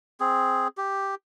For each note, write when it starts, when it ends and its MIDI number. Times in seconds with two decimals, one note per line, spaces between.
0.20 0.68 60
0.20 0.68 68
0.77 1.15 67